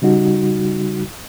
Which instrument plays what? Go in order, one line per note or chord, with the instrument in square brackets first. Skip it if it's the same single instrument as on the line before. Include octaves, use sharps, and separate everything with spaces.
[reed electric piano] C#3 G3 D#4 F#4